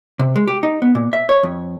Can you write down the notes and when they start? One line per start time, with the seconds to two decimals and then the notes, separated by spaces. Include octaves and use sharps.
0.19 C3
0.36 G#3
0.48 G4
0.63 D#4
0.82 B3
0.95 A#2
1.13 E5
1.29 C#5
1.43 F2